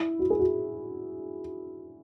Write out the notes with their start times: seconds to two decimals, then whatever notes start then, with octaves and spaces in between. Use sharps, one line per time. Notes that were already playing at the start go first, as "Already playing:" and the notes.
Already playing: E4
0.19 F#4
0.30 G#4
0.39 F#4